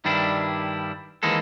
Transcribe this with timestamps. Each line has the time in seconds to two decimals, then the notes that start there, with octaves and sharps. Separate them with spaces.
0.05 G2 D#3 G3 D4 E4
1.23 D#2 E3 G#3 A#3 A4